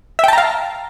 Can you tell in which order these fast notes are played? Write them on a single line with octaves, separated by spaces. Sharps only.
E5 G5 A5 A#5 F5